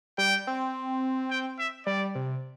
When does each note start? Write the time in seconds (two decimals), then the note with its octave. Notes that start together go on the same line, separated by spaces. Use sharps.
0.18 G3 G5
0.47 C4
1.31 G5
1.59 E5
1.86 G3 D5
2.15 C3